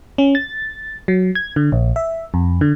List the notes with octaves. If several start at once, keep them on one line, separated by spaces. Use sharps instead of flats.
C#4
A6
F#3
G#6
D3
A#1
E5
F2
D3